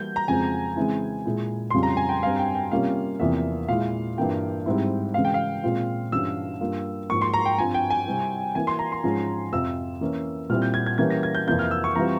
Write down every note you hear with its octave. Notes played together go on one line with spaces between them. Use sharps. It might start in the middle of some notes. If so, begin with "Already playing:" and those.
Already playing: E3 G3 A#3 E4 G6
A#5
F2 C#3 F3 G#3 C4 G#5
C#3 E3 G#3 C4 E4
A#2 G#3 E4
F2 C#3 G3 C#4 F4 C6
A#5
G#5
G5
G2 G3 C4 F5
G5
G5
C3 G3 A#3 C#4 F4 F5
E2 C3 F3 A#3 E4 E5
A#2 G#3 E4 F5
G2 E3 A#3 F4 G5
G#2 G3 C4 E4
C#3 E3 G#3 E4 F5
G5
F5
A#2 G#3 C4 F4
G2 E3 G3 C#4 F4 E6
G2 G3 A#3 F4
G#2 F3 A#3 C#6
C6
A#5
G5
G2 F3 C4 F4 G#5
G5
G#5
C3 G3 C4 E4
E3 A#3 E4 G#5
C6
A#5
C6
G#2 F3 G#3 C#4
F2 C3 F3 C4 F4 E6
E3 A#3 C#4
A#2 G3 C4 E4 F6
G6
G#6
G#6
E3 G3 A#3 C#4 G#6
A#6
G#6
G6
F2 C3 E3 A#3 F4 G6
F6
E6
C#6
E3 G3 C4 F4 A#5